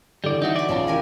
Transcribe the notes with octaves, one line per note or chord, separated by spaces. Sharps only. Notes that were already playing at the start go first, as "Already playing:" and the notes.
D3 E3 G3 D5
E3 D4 D#4 F#4 E5 D#6
D5 C#6 D6
B1 C#3 G#3 F4 A5 G7
D#3 E3 C#4 G4 A#4 G#5